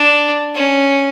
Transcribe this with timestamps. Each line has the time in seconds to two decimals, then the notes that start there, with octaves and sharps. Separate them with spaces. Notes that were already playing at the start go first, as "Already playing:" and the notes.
Already playing: D4
0.55 C#4